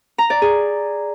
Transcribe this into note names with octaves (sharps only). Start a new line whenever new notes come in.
A#5
D5
G#4